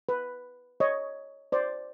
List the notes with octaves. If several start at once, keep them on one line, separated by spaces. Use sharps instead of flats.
B4
C#5 D#5
C5 D5